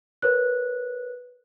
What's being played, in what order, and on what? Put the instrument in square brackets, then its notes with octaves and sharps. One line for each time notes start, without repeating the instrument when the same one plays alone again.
[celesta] A#4 B4 C#5 F#6